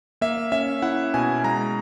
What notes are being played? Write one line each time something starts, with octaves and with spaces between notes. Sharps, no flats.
A#3 E5
C#4 E5
E4 F#5
B2 G#5
G#3 A#5